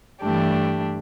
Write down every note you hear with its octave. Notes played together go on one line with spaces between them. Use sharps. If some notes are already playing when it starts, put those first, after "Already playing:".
G2 E3 A3 D4 G4